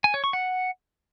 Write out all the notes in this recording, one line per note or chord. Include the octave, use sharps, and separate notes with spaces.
G#5
C#5
C#6
F#5